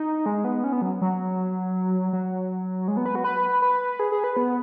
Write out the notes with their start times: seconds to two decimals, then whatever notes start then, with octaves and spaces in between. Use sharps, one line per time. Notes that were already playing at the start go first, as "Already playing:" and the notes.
Already playing: D#4
0.26 G#3
0.44 B3
0.64 C#4
0.72 B3
0.82 F#3
1.02 F#3
2.13 F#3
2.88 G#3
2.97 B3
3.06 B4
3.15 F#4
3.24 B4
3.62 B4
3.99 G#4
4.12 G#4
4.24 B4
4.37 B3